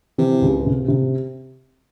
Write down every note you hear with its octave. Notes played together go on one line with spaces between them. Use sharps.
C3 E3
C#2
C3
C3